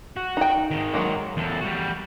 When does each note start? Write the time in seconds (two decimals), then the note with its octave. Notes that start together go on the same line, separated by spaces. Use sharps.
0.16 F#4
0.37 D#4 G5
0.71 G#2 D#3
0.94 F#3 G#3 A#3
1.37 E2 A4
1.61 G3 F#4